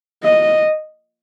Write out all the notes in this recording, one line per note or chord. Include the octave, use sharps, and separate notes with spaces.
D#5